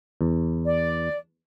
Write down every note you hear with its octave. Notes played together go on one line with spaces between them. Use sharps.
E2
D5